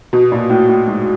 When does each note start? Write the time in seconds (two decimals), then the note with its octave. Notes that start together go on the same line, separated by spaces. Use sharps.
0.13 B2
0.32 A#2
0.50 A2
0.69 A2
0.87 G#2